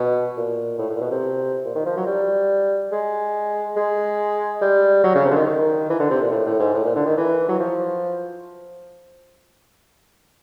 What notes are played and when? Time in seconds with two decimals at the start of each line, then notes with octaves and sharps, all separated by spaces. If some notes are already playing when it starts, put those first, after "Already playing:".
Already playing: B2
0.37 A#2
0.79 A2
0.90 A2
0.96 A#2
1.01 B2
1.11 C3
1.65 A#2
1.75 D#3
1.86 F3
1.97 F#3
2.06 G3
2.92 G#3
3.76 G#3
4.61 G3
5.04 F#3
5.15 C#3
5.25 C3
5.31 D3
5.36 D#3
5.47 D#3
5.90 E3
6.00 D3
6.10 C3
6.21 A#2
6.31 A2
6.46 A2
6.59 G#2
6.74 A2
6.85 A#2
6.96 D3
7.06 D#3
7.17 E3
7.49 F#3
7.59 F3